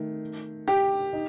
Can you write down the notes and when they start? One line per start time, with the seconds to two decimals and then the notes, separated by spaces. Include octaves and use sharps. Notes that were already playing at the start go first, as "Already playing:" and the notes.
Already playing: D#3 A3
0.68 G4
1.13 D#4